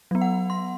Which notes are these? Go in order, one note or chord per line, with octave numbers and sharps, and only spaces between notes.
F#3 B3
F#5
C6